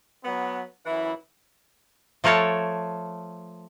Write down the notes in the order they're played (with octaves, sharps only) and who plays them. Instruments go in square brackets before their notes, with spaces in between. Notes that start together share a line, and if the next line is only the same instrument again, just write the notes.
[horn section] F#3 B3
F#2 E3 E4
[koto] F3 A3 A#4 C#5 A5